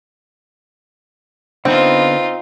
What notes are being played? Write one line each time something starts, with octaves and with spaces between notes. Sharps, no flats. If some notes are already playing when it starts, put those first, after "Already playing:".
D3 B3 C4 D#4 F4 B4